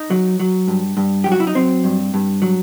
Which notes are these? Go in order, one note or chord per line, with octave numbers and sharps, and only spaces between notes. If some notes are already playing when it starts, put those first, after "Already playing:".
Already playing: D#4
F#3
F#3
G2
G2
F#3 G4
F#4
E4
D#4
F#3 C4
G2
G2
F#3